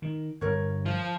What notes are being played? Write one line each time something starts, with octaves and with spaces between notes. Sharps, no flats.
D#3
G1 A#4 C#5
F3